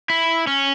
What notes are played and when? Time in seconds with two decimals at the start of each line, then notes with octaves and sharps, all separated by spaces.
0.10 E4
0.47 C#4